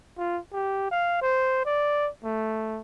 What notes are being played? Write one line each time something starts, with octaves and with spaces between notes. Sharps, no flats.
F4
G4
F5
C5
D5
A3